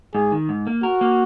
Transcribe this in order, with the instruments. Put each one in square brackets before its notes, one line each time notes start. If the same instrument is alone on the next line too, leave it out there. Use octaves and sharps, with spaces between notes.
[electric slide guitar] G#2 [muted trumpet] G#4
[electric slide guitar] D#3
G#2
A#3
[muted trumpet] F#4 [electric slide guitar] A#4
[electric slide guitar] A#3